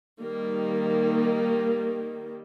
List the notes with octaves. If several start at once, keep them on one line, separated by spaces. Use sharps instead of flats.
D#3 G3 A#3